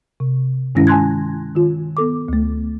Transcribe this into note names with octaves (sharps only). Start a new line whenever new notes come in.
C3
G2 D#3 G#3 C#4 E4 A#6
G#5 A5 C6 F#6 G#6
D#3 F4
B3 A4 D6
D2 A3